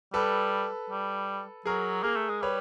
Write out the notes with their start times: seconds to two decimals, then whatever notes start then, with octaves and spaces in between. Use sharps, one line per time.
0.13 G3 A4 B4
0.90 G3
1.66 F#3 G#4 A#4
2.03 A#3 G#4 A#4
2.16 A3
2.30 G#3
2.42 G3 B4 C#5